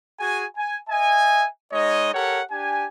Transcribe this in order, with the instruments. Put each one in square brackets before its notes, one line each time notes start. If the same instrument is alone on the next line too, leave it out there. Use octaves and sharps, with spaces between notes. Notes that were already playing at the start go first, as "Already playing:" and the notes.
[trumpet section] F#4 G#4 G#5
G#5
D#5 E5 G#5
G#3 D#4 C#5 D#5
G4 A4 A#4 C#5 F#5
D4 G4 G#5